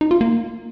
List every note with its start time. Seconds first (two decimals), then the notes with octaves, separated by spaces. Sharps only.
0.01 D#4
0.11 F4
0.21 A#3